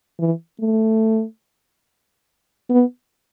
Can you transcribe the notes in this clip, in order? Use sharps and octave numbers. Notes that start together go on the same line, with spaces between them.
E3
A3
B3